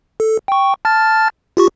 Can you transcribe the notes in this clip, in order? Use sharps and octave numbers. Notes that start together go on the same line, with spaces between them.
A4
G5 C#6
A5 F6 A6
F4 G4 C#6